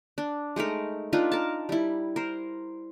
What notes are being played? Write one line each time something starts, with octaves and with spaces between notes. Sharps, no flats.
D4
G#3 A3 D#4 A#4
D4 D#4 F4 B4
A#4 A5
G3 E4
A#4 C5